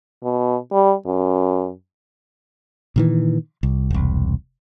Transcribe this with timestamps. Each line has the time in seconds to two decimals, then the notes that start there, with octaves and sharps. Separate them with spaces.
0.23 B2
0.72 G3
1.06 F#2
2.96 A#2 D#3 E3
3.63 C2
3.91 E1 C2